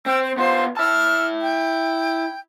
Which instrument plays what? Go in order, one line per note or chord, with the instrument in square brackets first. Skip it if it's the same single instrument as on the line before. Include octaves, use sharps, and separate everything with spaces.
[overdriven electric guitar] C4 [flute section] G5 E6 G6
[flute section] C5
[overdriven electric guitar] B3 F4 [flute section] C5 C6
[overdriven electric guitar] E4 A5 [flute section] E6 F6
[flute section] G5